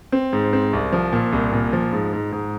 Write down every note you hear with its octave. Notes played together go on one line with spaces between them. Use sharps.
C4
G#2
C4
C2
F3
A#2
C2
A#2
F3
G#2
G#2
G#2